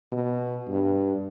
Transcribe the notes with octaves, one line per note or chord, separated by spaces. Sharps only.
B2
G2